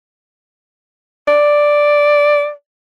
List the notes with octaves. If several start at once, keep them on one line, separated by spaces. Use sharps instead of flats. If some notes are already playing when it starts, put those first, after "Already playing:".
D5